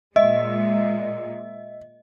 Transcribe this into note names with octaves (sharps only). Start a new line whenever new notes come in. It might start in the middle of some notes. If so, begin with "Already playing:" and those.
A#2 G#3 D#5 E5